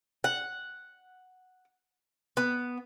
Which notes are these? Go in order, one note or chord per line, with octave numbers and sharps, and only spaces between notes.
F#5
B3